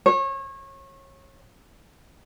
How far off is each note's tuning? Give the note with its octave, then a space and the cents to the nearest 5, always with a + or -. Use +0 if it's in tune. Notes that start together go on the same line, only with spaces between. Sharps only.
C#5 -30